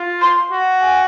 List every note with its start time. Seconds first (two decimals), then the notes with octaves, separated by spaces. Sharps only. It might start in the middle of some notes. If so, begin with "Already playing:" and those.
Already playing: F4
0.21 C6
0.51 F#4
0.81 G#5